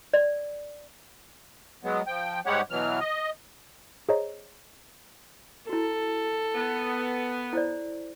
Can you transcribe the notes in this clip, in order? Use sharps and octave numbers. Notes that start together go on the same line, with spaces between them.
D5
F#3 G#3 B3
F3 G5
G#2 G3 G#3 G4 C#5 F#5
B2 E3 F#3 F6
D#5
G#4 C5 C#5 D#5 A#5
E4 F#4 A4
B3
E4 C5 D5